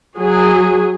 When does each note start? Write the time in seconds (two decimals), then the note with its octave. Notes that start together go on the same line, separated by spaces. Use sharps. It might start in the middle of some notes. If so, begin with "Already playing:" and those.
0.16 F#3 G#4